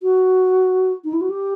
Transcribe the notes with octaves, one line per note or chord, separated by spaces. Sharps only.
F#4
D#4
E4
F#4
G4